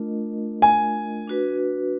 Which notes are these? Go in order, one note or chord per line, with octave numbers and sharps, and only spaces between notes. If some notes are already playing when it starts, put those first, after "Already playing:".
Already playing: A3 D4 F4 A#4 D#5
G#5
D4 F#4 B4